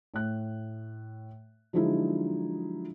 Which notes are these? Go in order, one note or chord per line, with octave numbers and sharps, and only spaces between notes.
A2 F#6
D3 F3 F#3 G#3 D#4 E4